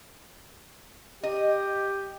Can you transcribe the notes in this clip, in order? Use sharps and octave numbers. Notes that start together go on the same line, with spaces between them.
G4 D#5